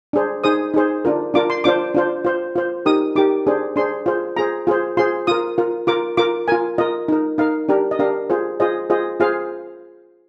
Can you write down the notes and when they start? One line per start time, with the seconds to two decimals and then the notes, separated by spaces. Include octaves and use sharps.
0.13 D4 G#4 C5
0.44 D#4 G#4 C5 D#6
0.74 D#4 G#4 C5
1.05 D4 F4 A#4
1.34 D4 F4 A#4 D6
1.50 C6
1.64 D4 F4 C5 D6
1.94 D4 F4 C5
2.25 F4 C5
2.56 F4 C5
2.86 D#4 G4 A#4 D#6
3.15 D#4 G4 A#4 D6
3.47 D4 G#4 C5
3.76 D4 G#4 C5 C6
4.06 F4 G#4 C5
4.36 F4 G#4 C5 A#5
4.67 F4 G#4 C5
4.97 F4 G#4 C5 C6
5.27 F4 A#4 D#6
5.58 F4 A#4
5.87 F4 A#4 D6
6.17 F4 A#4 D6
6.48 F4 A#4 G#5
6.78 F4 A#4 D#5
7.08 D#4 A#4
7.38 D#4 A#4 F5
7.69 D4 G4 A#4
7.91 D#5
7.99 D4 G4 A#4 F5
8.30 F4 G#4 C5
8.60 F4 G#4 C5 D#5
8.90 F4 G#4 C5 D#5
9.20 F4 G#4 C5 F5